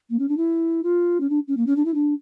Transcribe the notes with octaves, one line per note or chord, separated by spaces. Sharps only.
A#3
C#4
D4
E4
F4
C#4
D4
C#4
A#3
C#4
D4
E4
D4